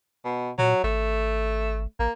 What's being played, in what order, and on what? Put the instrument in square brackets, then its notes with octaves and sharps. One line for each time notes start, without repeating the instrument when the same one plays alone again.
[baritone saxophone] B2
[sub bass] A#2 [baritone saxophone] F#3
[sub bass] G#1 [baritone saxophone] A3
[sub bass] A1 [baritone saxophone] A#3